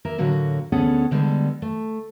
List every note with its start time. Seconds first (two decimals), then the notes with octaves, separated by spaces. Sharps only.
0.05 A#3 A#4 E5
0.18 A2 D3 F#3 A#3 F#4
0.72 D2 B3 C#4 G#4 A4 F#5
1.11 D3 G3 G#3 B3 A4
1.62 A3